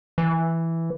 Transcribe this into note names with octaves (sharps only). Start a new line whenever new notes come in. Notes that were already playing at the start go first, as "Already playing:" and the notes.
E3